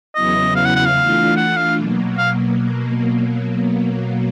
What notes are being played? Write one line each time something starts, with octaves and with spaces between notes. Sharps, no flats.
E2 C#3 F#3 B3 E4 D#5
F5
F#5
F#5
F5
E3 A3 D4 F4
F#5
F5
B2 F#3 A#3
F5